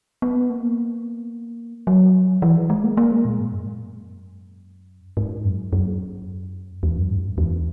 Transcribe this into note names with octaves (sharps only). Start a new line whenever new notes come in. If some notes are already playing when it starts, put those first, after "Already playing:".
B3
A#3
F#3
E3
G#3
A#3
A#3
G#3
A#2
G#2
F#2
G#2
F#2
F#2
E2
F#2
G#2
F#2
E2